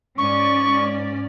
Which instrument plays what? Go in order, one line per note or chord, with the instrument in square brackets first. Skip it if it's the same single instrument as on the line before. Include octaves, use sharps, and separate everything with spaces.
[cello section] G#2 C#4 D5 [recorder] C#6